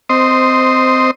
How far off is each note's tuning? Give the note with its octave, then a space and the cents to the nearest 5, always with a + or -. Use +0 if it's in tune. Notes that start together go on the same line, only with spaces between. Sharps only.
C4 -15 C5 +0 D#5 +0